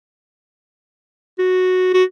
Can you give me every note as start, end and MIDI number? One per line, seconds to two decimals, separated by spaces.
1.39 1.92 66
1.94 2.04 66